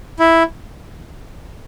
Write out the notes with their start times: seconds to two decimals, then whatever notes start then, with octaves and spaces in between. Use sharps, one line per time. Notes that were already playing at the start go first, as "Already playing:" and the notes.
0.20 E4